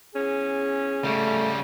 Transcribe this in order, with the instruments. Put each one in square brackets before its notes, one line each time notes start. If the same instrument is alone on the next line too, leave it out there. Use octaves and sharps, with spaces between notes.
[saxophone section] E2 C#4 [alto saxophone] G#4
[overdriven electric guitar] C#3 G3 [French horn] A3